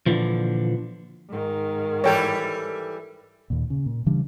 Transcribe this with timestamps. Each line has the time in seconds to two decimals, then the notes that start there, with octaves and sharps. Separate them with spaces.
0.06 A#2 D3 E3 F3
1.29 G#2 D#3
2.04 E3 G3 A4 C#5 G5
3.50 D#2 A#2
3.70 C#3
3.86 A#2
4.06 C#3 E3 G3 D4